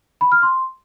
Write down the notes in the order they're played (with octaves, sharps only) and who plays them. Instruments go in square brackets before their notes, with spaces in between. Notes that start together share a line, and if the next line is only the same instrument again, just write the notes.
[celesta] B5
F6
C6